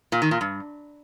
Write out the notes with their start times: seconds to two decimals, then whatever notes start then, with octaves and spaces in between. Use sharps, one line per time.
0.12 A#2
0.22 D#3
0.31 A#2
0.41 G2